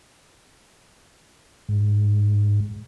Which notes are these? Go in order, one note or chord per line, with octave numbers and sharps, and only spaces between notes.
G#2